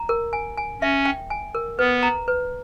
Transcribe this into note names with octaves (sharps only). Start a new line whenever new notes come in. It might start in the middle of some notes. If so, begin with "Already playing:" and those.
Already playing: A#5
A#4
G#5
G#5
C#4 E5
G5
G#5
A#4
B3 B4
A#5
B4